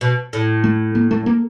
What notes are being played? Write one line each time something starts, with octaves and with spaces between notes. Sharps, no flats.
B2
A2
A3
A#3
A3
A#3